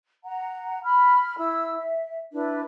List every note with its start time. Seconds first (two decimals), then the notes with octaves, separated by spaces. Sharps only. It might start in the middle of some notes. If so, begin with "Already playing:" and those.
0.24 F#5 A#5
0.83 B5 F6
1.38 E4 E6
1.77 E5
2.33 D4 E4 B4